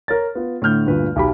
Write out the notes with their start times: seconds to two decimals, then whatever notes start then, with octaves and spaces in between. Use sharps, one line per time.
0.08 A#4 C#5 A6
0.35 B3 F4
0.62 A2 D3 F6 G6
0.86 D2 G2 A#2 B4
1.16 B1 G4 B5